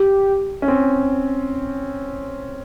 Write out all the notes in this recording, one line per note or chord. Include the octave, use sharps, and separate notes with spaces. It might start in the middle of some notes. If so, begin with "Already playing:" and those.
Already playing: G4
C#4
C4